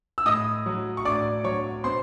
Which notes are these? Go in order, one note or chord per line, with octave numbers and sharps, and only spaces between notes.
E6
A2 D#5 D#6
F#3
C#6
A2 D5 D6
F#3 C#5 C#6
B2 C5 C6